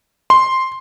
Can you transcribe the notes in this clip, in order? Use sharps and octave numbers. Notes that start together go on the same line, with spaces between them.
C6